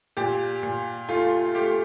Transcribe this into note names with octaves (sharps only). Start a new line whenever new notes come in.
A#2 G4
A#2
A3 F4
A3 G4